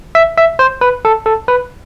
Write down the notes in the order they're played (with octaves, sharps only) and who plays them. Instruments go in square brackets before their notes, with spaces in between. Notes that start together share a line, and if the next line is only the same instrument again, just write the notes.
[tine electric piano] E5
E5
C5
B4
A4
A4
B4